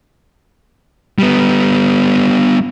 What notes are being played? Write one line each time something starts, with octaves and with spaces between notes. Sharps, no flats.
G3 B3